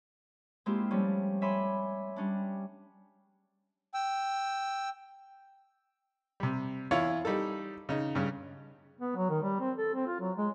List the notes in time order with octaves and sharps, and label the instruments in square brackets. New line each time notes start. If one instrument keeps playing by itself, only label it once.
[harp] G#3 A#3 C4 E4 F4 G4
F3 G3 A3 C#4
C#5 E5 G#5 B5 C6 D6
G3 C#4 D4
[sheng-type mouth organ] G5 E6
[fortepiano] C3 G3
E2 E4 F4 C#5 F5
G3 D#4 A4
C#3 D#4
G2 C#3
[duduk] B3
F#3
D#3
G3
C4
A4
C4
F4
F#3
G#3